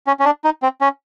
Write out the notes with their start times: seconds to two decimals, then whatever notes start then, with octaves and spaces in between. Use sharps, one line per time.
0.07 C#4
0.20 C#4
0.25 D4
0.44 D#4
0.63 C4
0.81 C#4